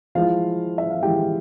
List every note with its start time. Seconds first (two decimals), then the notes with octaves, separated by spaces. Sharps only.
0.15 F3 G#3 E4 F4 F5
0.78 E5
0.91 F5
1.02 F3 G#3 E4 G4 G5